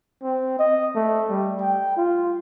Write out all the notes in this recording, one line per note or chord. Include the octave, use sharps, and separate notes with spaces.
C4
D#5
A3
G3
G5
F4